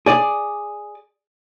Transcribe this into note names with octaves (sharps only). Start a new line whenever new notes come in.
G#4 D5